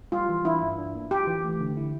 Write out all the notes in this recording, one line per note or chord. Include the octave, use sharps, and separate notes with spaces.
G3 F4
E3
D4 E4
G2
D4
A#3
F4 G4
E3
A3
D3
E4